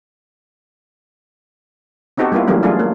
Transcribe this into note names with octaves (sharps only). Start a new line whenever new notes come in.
B3 C4 D#4 F#4 G4 A4
G3 A#3 B3 E4 F4
E3 F#3 G3 A3 A#3 C#4
F#3 A3 D4 F4 G#4
A#3